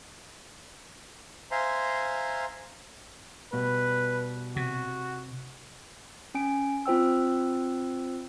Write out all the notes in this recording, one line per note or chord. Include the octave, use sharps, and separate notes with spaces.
C5 E5 F5 G#5 A#5 C6
B2 G3 B4
C3 F#4
C#4 G#5 D7
C4 F4 C5 G5 E6